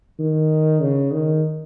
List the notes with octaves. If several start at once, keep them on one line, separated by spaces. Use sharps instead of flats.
D#3
C#3
D#3